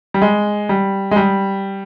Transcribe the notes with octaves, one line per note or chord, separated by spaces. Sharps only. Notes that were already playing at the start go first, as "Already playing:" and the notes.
G3
G#3
G3
G#3
G3